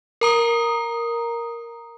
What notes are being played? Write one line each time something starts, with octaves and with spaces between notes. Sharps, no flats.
A#4 A#5 D#6